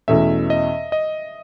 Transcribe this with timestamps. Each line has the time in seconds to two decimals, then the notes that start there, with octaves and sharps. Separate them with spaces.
0.08 E2 B2 A3 C#4 E5
0.50 D#5
0.92 D#5